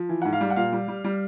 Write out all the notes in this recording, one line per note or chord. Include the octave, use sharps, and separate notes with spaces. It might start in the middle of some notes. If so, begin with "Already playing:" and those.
Already playing: F3
E3
G#2 F#5
F5
G3
F#5
A#2 F5
G3
G3
G3